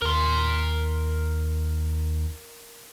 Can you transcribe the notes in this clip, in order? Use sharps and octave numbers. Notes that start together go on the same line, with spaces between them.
D#2 A#4 C6